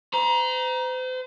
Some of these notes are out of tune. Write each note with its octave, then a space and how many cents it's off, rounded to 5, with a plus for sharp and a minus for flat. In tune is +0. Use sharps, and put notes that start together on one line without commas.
C5 -40 A#5 +20